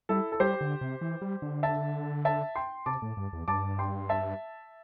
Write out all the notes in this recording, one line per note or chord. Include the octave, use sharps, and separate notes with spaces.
G3 E4 A4
A4
G3 G4 C5
D3
C3
E3
G3
D3
E5 A5
E5 A5
G5 C6
C3 A5 D6
A2
G2
E2
G2 A5 D6
G5 C6
E5 A5